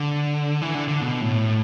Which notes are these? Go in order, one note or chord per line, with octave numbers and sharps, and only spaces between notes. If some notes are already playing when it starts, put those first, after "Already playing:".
Already playing: D3
E3
D3
D3
B2
A2